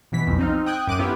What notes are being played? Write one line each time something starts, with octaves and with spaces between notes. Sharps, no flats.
B2 E3 B6
B1 F2
C4 D#4 F5
G5 D#6 F#6 G#6
F#2 D6 F#6 D#7
B3 E4 F4 G4